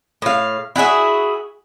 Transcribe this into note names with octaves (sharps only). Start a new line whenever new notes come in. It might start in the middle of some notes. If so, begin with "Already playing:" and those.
A2 F5
E4 F#4 G#4 E5